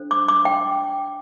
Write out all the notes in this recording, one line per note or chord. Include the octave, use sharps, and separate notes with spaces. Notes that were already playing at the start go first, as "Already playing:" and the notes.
Already playing: D4 A4 C5
D6
D6
G5